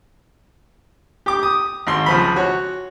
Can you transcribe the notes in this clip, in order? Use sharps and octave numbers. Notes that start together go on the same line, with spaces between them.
G4 D6
D#6
G#1 C6
C#2 F3 B5
F#4 C#5